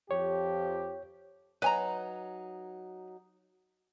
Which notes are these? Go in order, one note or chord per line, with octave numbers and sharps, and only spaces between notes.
F2 F3 G4 C#5
F#3 D#4 B4 G#5 A#5